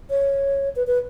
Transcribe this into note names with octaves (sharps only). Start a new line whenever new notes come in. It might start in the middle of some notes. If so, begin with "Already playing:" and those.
C#5
B4
B4